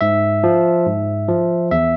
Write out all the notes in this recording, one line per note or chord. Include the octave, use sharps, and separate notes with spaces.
G#2 E5
F3
G#2
F3
E2 E5